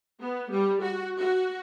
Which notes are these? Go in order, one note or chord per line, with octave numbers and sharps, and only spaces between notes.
B3
G3
F#4
F#4